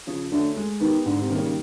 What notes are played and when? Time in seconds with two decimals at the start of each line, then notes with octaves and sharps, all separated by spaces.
0.07 C#3 F3
0.32 D3 A3 C#4 F#4 A4
0.56 G#3
0.80 D#3 B3 D#4 G4
1.05 G#2 D3
1.21 C3
1.29 D#3 G3 A#3 D#4
1.38 C#3